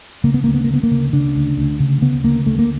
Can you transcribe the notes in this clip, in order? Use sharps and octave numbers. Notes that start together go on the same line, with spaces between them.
C#3 A#3
B3
D2 A#3
B3
D2 A#3
B3
A#3
C#3
C#3 D4
D2
D2
C#3
C#3 B3
D2 A#3
D2 A3
A#3